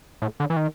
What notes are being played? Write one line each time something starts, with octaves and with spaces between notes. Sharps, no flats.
A2
D3
E3
D#3